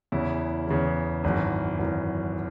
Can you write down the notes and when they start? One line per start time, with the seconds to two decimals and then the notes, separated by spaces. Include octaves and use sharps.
0.12 E2 C#3 E3 E4
0.68 E2 C#3 E3
1.24 G#1 F#2 E3
1.79 G#1 F#2 E3